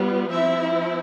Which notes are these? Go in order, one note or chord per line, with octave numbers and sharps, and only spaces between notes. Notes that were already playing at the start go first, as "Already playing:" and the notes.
Already playing: G3 B3 F4
F3 C4 E4 E5